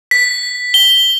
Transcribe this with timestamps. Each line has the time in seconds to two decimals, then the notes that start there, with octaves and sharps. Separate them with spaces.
0.11 B6
0.74 G7